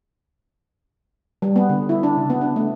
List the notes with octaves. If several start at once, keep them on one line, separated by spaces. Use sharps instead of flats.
G3
B3
D3
E4
D4
C#3
B3
D4
A3